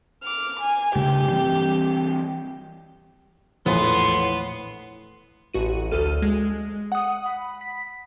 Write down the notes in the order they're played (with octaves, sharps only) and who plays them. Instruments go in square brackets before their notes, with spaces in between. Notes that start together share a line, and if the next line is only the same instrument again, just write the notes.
[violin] D6 F6
G#5
[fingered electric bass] G2 C#3 A3 [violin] G4
[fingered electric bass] E3 G3 C4
[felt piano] A#1 E2 [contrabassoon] A2 [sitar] B3 [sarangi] C6
[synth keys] A1 F#4 D#7
D2 A4 F6 D#7
G#3
F#5 D#6
B5
B6